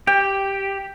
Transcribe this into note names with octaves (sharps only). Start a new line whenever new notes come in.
G4 G5